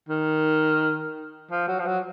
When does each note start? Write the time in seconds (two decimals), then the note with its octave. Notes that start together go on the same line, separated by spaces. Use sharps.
0.09 D#3
1.51 F3
1.68 F#3
1.79 F3
1.86 F#3